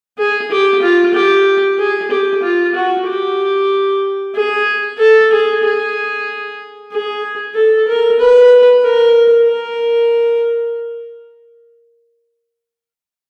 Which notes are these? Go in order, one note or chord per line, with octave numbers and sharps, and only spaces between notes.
G#4
G4
F4
G4
G#4
G4
F4
F#4
G4
G#4
A4
G#4
G#4
G#4
A4
A#4
B4
A#4
A#4